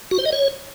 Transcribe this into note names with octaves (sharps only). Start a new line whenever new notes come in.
F#4
C5
D#5
C#5